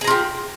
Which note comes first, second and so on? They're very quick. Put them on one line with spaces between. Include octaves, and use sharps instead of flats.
G#4 A#5 F4 G4